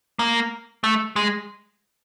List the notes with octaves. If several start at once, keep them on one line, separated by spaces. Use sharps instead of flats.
A#3
A3
G#3